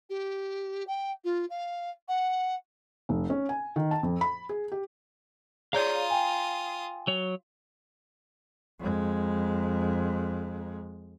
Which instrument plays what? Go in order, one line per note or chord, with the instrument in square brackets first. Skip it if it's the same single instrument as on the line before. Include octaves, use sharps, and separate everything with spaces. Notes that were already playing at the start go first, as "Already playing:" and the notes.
[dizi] G4
G5
F4
F5
F#5
[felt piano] F1
C#4
G#5
D#3
A5
F2
B5
G#4
G4
[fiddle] F4 D#6 [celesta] G#4 C#5 D5 [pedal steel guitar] F5 A#5 G6
[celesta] G5 G#5
[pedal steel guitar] F#3 C#5
[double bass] F2 G#3